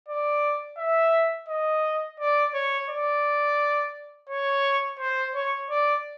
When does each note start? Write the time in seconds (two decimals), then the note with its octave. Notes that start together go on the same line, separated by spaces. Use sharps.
0.08 D5
0.78 E5
1.49 D#5
2.20 D5
2.54 C#5
2.90 D5
4.29 C#5
4.99 C5
5.35 C#5
5.70 D5